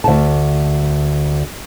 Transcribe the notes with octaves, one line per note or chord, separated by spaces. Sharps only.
D2 A5